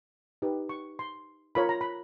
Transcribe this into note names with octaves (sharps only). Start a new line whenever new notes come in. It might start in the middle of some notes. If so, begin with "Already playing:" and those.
D#4 G4 B4
C#6
C6
F4 A#4 C#5 B5
A#5
B5